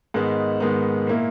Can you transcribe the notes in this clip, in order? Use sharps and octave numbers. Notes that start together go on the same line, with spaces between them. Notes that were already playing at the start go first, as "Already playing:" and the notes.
G#2 D#3 G#3 B3 D#4
G#2 D#3 G#3 B3 D#4
A#2 A#3 E4